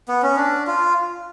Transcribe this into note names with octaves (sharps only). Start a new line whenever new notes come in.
B3
C#4
D4
F4